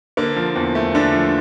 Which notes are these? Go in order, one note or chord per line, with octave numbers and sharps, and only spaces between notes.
D3 A#3
F3
E2
A3
D3 D4
F3